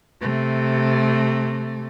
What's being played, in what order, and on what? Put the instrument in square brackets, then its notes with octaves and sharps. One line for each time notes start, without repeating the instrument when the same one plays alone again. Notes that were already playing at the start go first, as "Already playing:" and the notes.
[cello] C3 A3